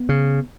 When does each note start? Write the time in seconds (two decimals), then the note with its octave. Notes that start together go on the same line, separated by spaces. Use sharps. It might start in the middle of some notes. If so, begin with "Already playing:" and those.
Already playing: B3
0.09 C#3